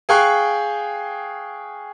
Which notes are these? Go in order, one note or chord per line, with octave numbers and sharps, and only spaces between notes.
G#4 F5 G5 C#6 F#6